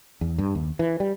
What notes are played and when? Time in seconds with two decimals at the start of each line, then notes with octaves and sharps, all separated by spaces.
0.21 E2
0.38 G2
0.55 D#2
0.79 E3
1.00 G3